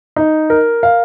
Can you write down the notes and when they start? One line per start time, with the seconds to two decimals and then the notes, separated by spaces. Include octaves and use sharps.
0.16 D#4
0.50 A#4
0.83 F5